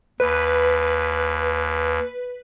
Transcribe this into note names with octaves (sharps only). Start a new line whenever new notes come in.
D#2 B4